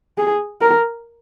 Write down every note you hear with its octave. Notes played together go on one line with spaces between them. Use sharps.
G#4
A#4